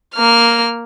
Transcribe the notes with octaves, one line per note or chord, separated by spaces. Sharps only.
A#3 F6